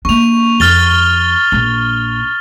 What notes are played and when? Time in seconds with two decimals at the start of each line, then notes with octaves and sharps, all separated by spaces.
0.05 A#3 D4 C#6 F7
0.60 F2 F6 A6 G7
1.52 A#1 D4